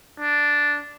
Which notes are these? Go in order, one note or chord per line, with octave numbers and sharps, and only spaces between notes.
D4